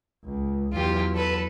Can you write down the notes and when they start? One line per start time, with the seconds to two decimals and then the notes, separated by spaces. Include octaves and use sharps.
0.24 C#2
0.73 E2 F#3 F4 G4
1.15 A4 B4